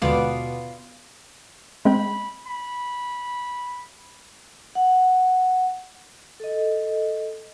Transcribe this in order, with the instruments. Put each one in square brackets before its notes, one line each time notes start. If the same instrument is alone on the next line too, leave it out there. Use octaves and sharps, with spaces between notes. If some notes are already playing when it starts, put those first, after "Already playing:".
[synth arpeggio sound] D#2 D3 G#3 [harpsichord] B2 [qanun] B3 D5 [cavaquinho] F4 D6
[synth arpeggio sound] G#3 C4 G5 [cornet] B5
[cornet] B5
[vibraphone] F#5
A4 D#5